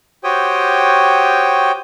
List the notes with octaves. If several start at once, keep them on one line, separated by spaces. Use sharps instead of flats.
F#4 G4 C5 C#5 G5 D#6